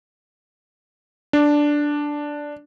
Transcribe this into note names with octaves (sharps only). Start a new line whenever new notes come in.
D4